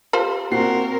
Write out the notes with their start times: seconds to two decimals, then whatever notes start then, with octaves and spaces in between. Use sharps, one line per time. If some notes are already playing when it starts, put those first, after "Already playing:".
0.13 F4 G4 C5
0.51 A#2 C4 F#4 A#4 C7